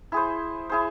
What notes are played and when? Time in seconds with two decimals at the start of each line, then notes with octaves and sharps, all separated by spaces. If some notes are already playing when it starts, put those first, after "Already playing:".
0.12 E4 G#4 C5
0.69 E4 G#4 C5